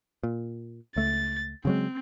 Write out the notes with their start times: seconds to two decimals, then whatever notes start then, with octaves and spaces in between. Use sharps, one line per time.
0.23 A#2
0.96 C#2 A3 A6
1.65 C#3 F#3 G#3 C4